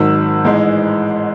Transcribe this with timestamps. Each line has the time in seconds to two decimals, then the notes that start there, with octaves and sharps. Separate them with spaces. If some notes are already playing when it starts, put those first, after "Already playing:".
Already playing: G#1 G#2 D#3 F#3 E6
0.44 A1 G#2 E3 G#3